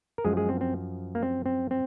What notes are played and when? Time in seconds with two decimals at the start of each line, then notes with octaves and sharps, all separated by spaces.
0.18 A#4
0.25 F#2 F3 G#3 G#4
0.37 G#3 G#4
0.49 C4
0.61 C4
1.15 A#3
1.23 C4
1.46 C4
1.71 C4